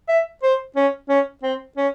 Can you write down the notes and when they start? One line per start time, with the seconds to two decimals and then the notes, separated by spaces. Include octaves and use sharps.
0.08 E5
0.43 C5
0.76 C#4
1.09 C#4
1.43 C4
1.77 C#4